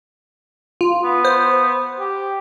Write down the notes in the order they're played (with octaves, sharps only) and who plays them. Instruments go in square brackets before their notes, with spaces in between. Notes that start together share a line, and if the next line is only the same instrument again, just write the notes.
[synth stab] F4
[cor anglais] B3
[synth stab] C5
[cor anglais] G4